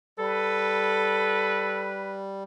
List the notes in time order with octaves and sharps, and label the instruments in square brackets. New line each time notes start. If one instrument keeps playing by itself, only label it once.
[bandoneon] G3 [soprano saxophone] A4 [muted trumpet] B4